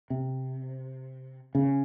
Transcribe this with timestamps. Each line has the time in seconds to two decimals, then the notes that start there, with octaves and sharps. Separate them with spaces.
0.10 C3
1.55 C#3